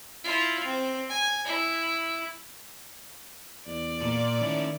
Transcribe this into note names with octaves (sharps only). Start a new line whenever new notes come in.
E4 F4
C4
G#5
E4
E2 D5
A#2
D#3 C#4 E4